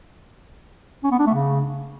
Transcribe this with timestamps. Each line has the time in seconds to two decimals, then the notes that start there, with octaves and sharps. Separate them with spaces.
1.04 C#4
1.11 B3
1.19 D4
1.27 A3
1.34 C#3